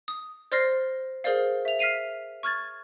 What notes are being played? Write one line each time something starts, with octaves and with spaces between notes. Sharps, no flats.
D#6
C5 D5 C6 F6 A#6 C7
G#4 A#4 C5 D5 F5
E5 F7
F6 B6 C7 D#7 F7
C#6 F6 G#6 A6